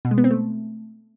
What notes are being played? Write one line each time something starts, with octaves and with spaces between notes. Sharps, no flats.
B2
G#3
B3
C4
A3